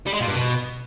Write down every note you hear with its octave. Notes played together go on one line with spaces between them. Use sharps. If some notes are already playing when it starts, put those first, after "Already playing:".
G3
G#3
A#2
G2
B2